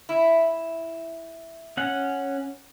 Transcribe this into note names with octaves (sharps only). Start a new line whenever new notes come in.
E4
C#4 F#5